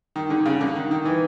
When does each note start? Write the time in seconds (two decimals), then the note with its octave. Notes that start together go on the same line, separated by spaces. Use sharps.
0.16 D#3
0.30 D3
0.46 C#3
0.61 D3
0.75 D#3
0.91 D#3
1.05 E3